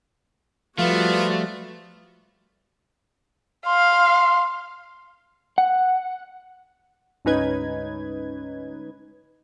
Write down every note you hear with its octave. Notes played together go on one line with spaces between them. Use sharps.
F3 G3 A3 B3 F4 F#4
F5 C6
F#5
D2 G#2 C#4 D#4 B4 G#6